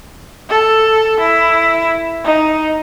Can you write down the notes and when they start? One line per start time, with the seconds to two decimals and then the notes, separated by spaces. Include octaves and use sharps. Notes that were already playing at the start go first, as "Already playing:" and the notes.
0.49 A4
1.20 E4
2.24 D#4